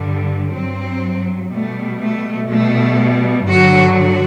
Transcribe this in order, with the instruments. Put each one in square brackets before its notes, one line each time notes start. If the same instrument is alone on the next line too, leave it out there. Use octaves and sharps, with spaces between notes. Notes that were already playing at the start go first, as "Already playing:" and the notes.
Already playing: [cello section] G2 D3 G3
G2 F#3 C4
B2 G3 A3
A3
B2 G3 A3
G2 D3 F#3 F#4
F#4